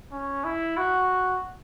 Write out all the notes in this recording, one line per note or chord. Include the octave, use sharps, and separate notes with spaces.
C#4
E4
F#4